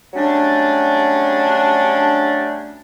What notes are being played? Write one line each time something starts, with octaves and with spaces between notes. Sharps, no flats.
F#3 G3 A3 C#4 D4